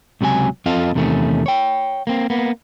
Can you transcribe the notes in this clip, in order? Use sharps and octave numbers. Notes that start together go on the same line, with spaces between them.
C#2 C3 F#3 B4 G#5
F2 C4 F4 A4 D#5 F5
E2 C3 D#3 A3 C#4
C#5 G5
A#3 C4
A#3 B3